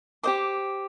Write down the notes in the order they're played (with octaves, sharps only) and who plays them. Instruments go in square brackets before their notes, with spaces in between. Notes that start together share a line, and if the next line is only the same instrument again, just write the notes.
[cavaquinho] G4 C5 D#5 D6